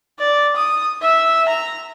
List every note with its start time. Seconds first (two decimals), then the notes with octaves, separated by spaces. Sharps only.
0.19 D5
0.56 D#6
1.02 E5
1.48 A#5